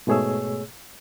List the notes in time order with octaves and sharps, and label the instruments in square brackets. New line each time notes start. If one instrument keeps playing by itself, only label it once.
[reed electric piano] G#2 B2 A3 G#4 C#5 E6